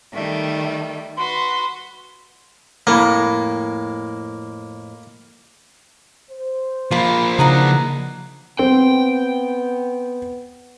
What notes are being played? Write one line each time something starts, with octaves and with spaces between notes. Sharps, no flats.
D#3 G3 A3
F#4 B4 C6
F2 A2 A#3
C5
F3 A#3 F4 B5
C#3 E3 D4 D#4 F#5 A#5
B3 C4 G5